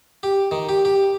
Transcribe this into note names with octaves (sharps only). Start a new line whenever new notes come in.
G4
D#3
G4
G4